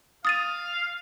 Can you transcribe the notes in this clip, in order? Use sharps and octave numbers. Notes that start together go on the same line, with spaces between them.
F5 D#6 A6 D#7